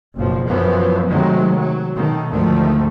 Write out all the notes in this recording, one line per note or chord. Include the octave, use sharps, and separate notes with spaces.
F#1 B1 F3
F#2 E3 F3 B3
C3 D#3 F#3 G#3 A3
F#3
B2 D#3 A3
D2 G#2 D#3 F3 A3